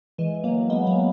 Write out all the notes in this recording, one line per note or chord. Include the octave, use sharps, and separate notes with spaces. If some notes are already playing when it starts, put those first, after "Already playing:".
E3 G#3
F#3 A#3
G#3 B3
F#3 A#3